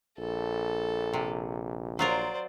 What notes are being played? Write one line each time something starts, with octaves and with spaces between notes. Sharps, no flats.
A#1 A4
C3
F#3 F4 A#4 C5 D5